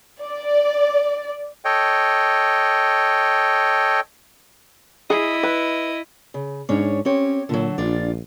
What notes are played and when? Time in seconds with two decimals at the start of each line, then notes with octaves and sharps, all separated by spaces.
0.25 D5
1.64 A4 C#5 D#5 G5
5.10 E4 G#4 D#5
5.43 B4
6.34 C#3
6.69 G#2 C#4 D4 C#5
7.05 C4 C#4 G4 C#5
7.49 A#2 D3 F#3
7.78 A#1 D4 F4 D5